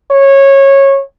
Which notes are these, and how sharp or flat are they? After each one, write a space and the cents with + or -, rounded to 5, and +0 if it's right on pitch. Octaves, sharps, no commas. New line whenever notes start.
C#5 -15